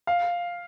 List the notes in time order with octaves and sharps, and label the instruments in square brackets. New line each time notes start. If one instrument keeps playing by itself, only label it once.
[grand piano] F5